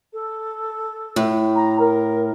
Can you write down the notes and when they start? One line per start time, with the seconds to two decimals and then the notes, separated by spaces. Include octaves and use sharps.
0.13 A4
1.16 A2
1.55 A#5
1.79 A#4